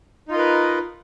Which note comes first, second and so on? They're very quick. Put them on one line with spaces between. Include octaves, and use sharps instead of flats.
D#4 F4 D#5 A#4 B4